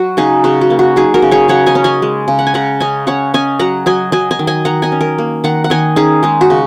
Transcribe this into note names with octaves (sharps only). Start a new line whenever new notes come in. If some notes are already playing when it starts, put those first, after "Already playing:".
Already playing: F#3 F#4
C#3 D#4 G#4
C#3 F#4
F#4
A#3
F#4
F#3 D#4 G#4
F#4 A#4
C#3
G#4 C#5
C#3 C#5 F#5
D#5 G#5
C#4
D#5 G#5
G#3
C#3
F#5
G#5
C#3 F#5 A#5
C#4 D#5 G#5
C#4 C#5 F#5
C#4 D#5 G#5
F#3 F#5 A#5
F#3 D#5 G#5
F#3 D#5 G#5
D#5 G#5
D#3
D#5 G#5
D#3 F#5 A#5
D#5 G#5
C#4
A#4 D#5
A#3
D#3 F#5 A#5
F#5
D#3 D#5 G#5
C#4 D#4 G#4
G#3 D#4
F#4
C#3